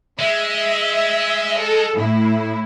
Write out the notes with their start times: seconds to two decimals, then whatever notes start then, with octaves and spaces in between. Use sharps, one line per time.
0.19 G#3 E5
1.59 A4
1.95 A2 E4